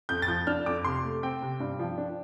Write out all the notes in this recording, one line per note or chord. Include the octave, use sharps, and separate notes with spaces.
F2 G6
A6
F3 G6
D4 F6
F2 D6
C3 C6
A3
C4 G5
C3
G2
F3
D4